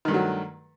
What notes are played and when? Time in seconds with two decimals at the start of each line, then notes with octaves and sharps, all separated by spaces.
0.05 D#3
0.08 G2
0.11 A3
0.14 F#3